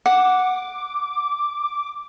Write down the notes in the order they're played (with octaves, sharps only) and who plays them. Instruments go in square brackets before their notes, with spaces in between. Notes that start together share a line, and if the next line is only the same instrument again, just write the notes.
[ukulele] F#5 [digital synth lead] D6